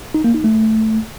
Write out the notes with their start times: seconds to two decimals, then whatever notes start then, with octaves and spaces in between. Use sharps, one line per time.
0.14 D#4
0.24 A#3
0.34 D#4
0.44 A3